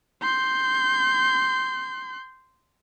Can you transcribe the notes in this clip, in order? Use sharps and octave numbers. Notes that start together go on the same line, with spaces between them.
C6 G6